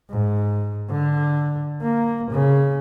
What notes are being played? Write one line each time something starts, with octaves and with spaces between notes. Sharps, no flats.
G#2
D3
A#3
C#3